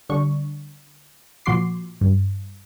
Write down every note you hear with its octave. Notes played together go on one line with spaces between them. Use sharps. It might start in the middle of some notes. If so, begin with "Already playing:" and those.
D3 G3 D4 C#6
A#2 F3 F#4 C6 D6 C7
G2